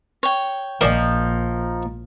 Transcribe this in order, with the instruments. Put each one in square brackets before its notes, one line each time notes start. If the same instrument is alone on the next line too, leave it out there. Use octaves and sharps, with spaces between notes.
[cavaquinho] C#5 G5
[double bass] A#1 [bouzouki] F3 D#4 [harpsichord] A#4 D5 G#5